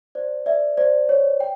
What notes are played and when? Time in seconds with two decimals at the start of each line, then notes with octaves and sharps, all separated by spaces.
0.15 C5 D5
0.46 D5 E5
0.77 C5 D5
1.09 C#5
1.40 G5